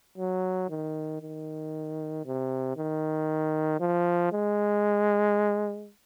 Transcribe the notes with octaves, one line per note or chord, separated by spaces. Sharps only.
F#3
D#3
D#3
C3
D#3
F3
G#3